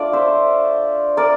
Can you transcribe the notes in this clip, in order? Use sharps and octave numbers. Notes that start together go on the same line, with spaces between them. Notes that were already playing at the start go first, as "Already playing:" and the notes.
Already playing: A3 D4 F4 D5
C5 E5
A#4 D5